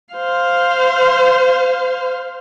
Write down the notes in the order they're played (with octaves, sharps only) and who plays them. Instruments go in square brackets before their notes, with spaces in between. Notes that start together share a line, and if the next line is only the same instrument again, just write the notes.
[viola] C5 F5